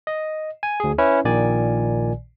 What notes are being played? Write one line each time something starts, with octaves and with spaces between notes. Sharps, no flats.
D#5
G#5
D2 G#4
C#4 E4 B4
A#1 A#2 D#3 D5 G#5